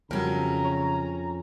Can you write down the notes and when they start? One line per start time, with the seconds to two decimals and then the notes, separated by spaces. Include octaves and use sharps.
0.11 F2 C#3 F#3 G3 C#4 A#4 A#5
0.64 C#5